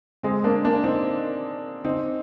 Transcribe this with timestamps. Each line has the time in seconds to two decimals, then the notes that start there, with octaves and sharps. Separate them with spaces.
0.23 G#3 C4
0.44 A#3 D4
0.64 A#3 D4
0.84 C4 D#4
1.84 C4 D#4